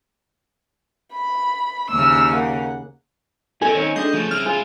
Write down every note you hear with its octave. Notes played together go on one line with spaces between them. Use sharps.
B5
D#2 C#3 E6 F6
A#3 F#5
B2 C4 C#4 A4 G#5
D#3 C#5
G#3 D4 A4 D#5 G6
C#3 F3 A3
C4 E4 F6
G#3 E4 F4